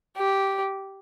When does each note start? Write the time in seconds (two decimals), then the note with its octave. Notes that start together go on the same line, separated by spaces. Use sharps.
0.17 G4